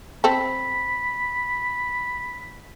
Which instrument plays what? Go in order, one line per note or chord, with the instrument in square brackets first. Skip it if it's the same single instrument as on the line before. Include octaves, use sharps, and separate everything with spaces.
[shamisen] C4 A4 [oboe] B5